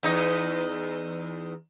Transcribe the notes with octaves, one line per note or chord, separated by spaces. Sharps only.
E2 D#4 D#5